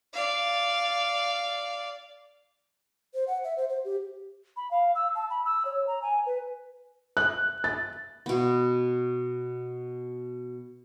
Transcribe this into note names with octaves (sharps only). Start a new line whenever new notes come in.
D5 F5
C5
F#5
E5
C5
C5
G4
B5
F5
E6
A5
B5
E6
C#5
A#5
G#5
B4
F#6
A6
B2 B3